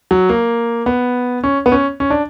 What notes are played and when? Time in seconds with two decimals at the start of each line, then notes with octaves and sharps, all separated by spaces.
0.11 F#3
0.29 A#3
0.86 B3
1.44 C#4
1.66 B3
1.72 C#4
2.00 C#4
2.10 D4